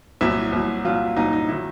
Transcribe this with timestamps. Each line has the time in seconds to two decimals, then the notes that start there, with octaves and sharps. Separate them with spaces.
0.21 C2 A#2 F#3 E4
0.53 C2 A#2 F#3
0.85 C2 A#2 F#3 F4
1.16 C2 A#2 F#3 D#4
1.33 D#4
1.48 D#3 F#3 E4